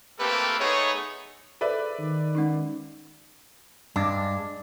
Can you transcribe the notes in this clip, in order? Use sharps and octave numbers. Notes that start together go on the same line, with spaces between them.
A3 A#3 C4 G4 A4 B4
A3 B3 D#4 G#4 C#5
G#4 A4 B4 C5 D5 E5
D#3
G#3 C#4 D#4
G2 G#3 D4